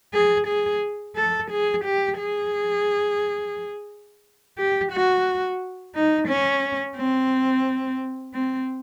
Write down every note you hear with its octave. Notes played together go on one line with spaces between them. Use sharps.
G#4
G#4
A4
G#4
G4
G#4
G4
F#4
D#4
C#4
C4
C4